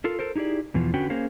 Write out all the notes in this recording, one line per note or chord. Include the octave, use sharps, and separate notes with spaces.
F4 A4 A#4
A4 A#4 C5
D#4 E4 G4 G#4 D5
E2 B2 E3 F3
D3 C#4 F#4 B4 G5
A#3 C#4 G#4 A#4 C5 F5